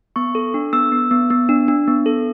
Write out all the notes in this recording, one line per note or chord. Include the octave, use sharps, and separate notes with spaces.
B3 C#6
A4
D4
B3 E6
B3
B3
B3
D4
D4
B3
A4